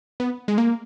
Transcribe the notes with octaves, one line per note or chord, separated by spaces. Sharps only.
B3
G#3
A#3